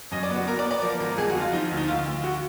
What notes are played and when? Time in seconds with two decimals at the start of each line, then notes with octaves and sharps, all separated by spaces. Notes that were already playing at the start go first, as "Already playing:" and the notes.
0.11 F#2 D#5
0.23 D5
0.30 B3
0.36 F#4
0.47 B3 A#4
0.59 D5
0.65 B3
0.71 D5
0.82 F3 A#4
1.00 G#1 A#4
1.17 F2 G#4
1.30 F#4
1.35 F2
1.41 F4
1.53 F3 D#4
1.71 D2
1.77 D#4
1.88 D2 F4
2.05 D2
2.24 F#4